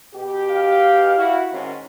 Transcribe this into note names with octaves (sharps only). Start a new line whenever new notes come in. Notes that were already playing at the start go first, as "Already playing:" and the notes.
B2 G4
F5
E4 F#4
G#2 D#3 C#4